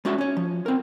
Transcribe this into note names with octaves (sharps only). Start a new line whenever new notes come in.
G#3 C#4 F#4 D5 E5
C#4 C#5
F3
C4 A#4